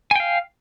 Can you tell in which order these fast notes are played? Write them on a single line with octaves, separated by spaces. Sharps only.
G#5 G5 F5